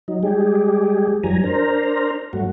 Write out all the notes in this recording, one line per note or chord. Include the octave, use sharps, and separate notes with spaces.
F#3 D#4
G3 G#3 G4 G#4
F#2 E3 F#3 G3 G#5 A#5
D4 A#4 C5 A#5
G2 F#3 A3 F#4